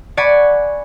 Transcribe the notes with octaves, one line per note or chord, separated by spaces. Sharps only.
D5 F#5 G#5 B5 C#6